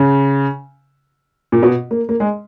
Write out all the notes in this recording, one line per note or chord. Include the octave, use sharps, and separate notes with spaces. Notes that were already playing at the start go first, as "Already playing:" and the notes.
Already playing: C#3
A#2
B2
A#3
A#3
G#3